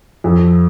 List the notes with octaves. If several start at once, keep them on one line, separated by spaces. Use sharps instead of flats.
F2